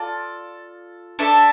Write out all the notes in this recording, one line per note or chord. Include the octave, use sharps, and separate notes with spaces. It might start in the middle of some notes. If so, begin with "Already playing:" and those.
Already playing: F4 A4 D5
D4 A4 E5